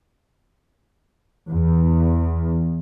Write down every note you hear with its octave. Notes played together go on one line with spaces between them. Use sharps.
E2